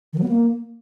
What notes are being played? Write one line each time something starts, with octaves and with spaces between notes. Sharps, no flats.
D#3
F#3
B3
A#3